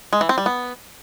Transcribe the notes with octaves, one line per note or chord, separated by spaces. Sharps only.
G#3
E3
C4
G3
B3